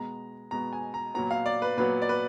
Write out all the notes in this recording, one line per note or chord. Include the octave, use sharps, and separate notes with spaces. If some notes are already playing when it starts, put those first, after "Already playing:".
Already playing: B2 G#3 B3 A#5
B2 G#3 B3 A#5
G#5
A#5
A#2 F#3 B3 A#5
F5
D5
B4
A#2 F#3 B3 B4
D5
B4